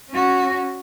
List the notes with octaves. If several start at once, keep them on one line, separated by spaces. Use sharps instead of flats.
C#4 F#4